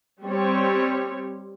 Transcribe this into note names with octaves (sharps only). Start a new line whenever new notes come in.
G3 C4 C#5